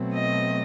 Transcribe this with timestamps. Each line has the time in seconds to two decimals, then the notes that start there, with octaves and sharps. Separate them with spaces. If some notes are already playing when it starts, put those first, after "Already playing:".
Already playing: B2 F#3 A3 C4
0.13 D#5